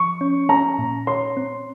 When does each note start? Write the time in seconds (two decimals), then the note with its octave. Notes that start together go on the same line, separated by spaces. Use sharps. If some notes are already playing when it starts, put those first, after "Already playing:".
Already playing: F3 C#6
0.21 C#4
0.49 C#4 A#5
0.79 A#2
1.07 C#5 C6
1.37 C4